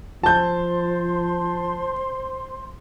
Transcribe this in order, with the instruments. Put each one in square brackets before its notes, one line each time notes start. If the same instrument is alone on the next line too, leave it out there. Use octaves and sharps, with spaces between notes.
[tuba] F3 [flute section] C5 C6 [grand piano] A5 G6